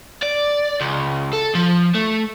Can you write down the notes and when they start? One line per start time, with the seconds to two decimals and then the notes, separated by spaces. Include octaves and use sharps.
0.22 D5
0.80 C#2
1.33 A4
1.55 F3
1.94 A3